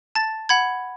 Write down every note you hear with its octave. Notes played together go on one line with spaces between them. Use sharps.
A5 A6
F#5 B5 G#6